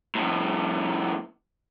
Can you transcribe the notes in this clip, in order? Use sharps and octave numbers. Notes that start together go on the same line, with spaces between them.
F2 A2